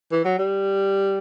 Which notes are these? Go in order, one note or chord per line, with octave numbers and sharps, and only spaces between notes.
E3
F#3
G3